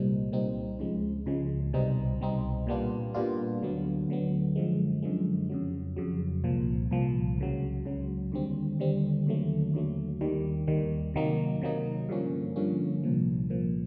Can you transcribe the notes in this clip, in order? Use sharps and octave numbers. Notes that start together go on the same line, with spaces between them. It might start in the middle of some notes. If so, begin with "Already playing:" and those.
Already playing: C2 A#2 G3 C4 D#4
C2 A#2 G3 C4 D#4
C#2 C#3 F3 G#3
C#2 C#3 F3 G#3
C2 B2 G3 C4 D#4
C2 B2 G3 C4 D#4
A#2 G3 B3 D4 F4
A#2 G3 B3 D4 F4
D2 D3 F#3 B3
D2 D3 F#3 B3
F#2 D3 F3 G#3
F#2 D3 F3 G#3
F2 C#3 F#3
F2 C#3 F#3
C2 A#2 F3
C2 A#2 F3
C#2 C#3 F#3
C#2 C#3 F#3
D#2 D3 G3 C4
D#2 D3 G3 C4
D#2 D3 F#3 A3
D#2 D3 F#3 A3
D#2 D#3 G3
D#2 D#3 G3
C3 D#3 F#3 A#3 D#4
C3 D#3 F#3 A#3 D#4
G2 D3 F3 A#3 C#4
G2 D3 F3 A#3 C#4
C2 A#2 F3
C2 A#2 F3